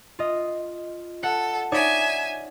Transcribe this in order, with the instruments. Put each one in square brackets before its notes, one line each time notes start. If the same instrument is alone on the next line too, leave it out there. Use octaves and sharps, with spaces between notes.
[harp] F4 D#5
[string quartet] A4 [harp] F#5
[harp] D#4 C#5 D5 [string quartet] E5 G#5